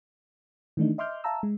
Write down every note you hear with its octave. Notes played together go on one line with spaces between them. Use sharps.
D#3 E3 A3 D4 D#4
D#5 E5 C6 D6 F6 G6
E5 F5 A5 A#5 E6
G#3